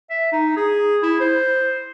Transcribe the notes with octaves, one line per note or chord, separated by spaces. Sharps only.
E5
D#4
G#4
E4
C5